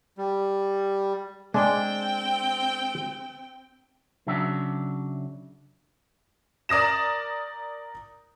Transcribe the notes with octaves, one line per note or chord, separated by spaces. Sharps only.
G3
G#3 C4 D4 G5
C#3 F#3 D4 E5
A#4 D5 D#6 A#6 E7